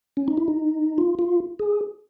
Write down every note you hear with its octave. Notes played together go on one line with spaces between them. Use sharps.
C#4
D#4
E4
D#4
F4
F4
G#4